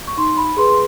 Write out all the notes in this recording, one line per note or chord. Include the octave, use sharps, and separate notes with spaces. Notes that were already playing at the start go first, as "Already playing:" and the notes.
C#6
D#4 C6
B5
G#4 B4 C6
C6